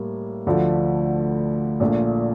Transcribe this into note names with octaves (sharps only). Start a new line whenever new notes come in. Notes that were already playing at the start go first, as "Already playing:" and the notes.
Already playing: A2 G3 A#3
D2 D3 F3 A3
A#1 A#2 A3